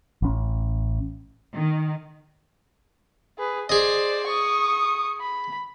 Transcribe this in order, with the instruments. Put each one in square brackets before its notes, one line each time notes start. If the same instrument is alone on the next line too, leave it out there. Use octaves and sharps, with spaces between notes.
[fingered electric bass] A1 C#4
[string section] D#3
[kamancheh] G#4 B4
[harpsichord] G#4 D#5 [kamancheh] C5 D5
[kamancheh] C#6 D#6
B5